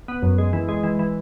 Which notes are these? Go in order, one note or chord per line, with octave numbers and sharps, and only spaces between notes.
B3
F#2
G#3
E3
G#3
E3
E3